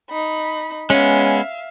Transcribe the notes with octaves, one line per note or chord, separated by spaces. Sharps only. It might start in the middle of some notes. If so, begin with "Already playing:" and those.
D#4 B5
G#3 B3 C#4 E5 F5